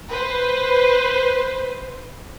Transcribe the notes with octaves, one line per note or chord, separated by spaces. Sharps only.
B4 C5